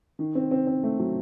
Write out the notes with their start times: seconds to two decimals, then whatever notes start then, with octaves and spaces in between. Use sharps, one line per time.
0.19 D#3
0.35 C4
0.51 C4
0.67 C4
0.83 A3
0.99 F#3